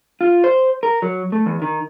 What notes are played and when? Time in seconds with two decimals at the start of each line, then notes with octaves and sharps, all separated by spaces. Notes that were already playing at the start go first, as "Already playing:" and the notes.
0.21 F4
0.44 C5
0.83 A#4
1.02 F#3
1.32 A3
1.46 E2
1.62 D#3